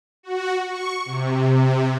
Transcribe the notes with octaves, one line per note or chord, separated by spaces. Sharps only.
F#4
C#6
C3